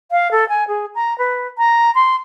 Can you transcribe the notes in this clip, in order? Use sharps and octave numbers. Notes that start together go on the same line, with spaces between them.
F5
A4
G#5
G#4
A#5
B4
A#5
C6